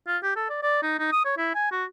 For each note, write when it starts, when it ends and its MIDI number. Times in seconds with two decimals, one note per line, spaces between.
0.07 0.18 65
0.23 0.33 67
0.36 0.45 69
0.49 0.60 74
0.63 0.81 74
0.83 0.98 63
0.99 1.11 63
1.12 1.23 87
1.25 1.34 73
1.38 1.53 64
1.55 1.69 80
1.72 1.85 66